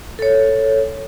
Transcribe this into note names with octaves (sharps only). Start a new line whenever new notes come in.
A4 C#5